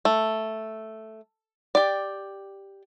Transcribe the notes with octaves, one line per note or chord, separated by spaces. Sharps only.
A3
G4 D5